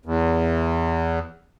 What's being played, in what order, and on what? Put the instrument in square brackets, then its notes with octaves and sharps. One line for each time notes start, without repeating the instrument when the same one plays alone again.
[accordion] E2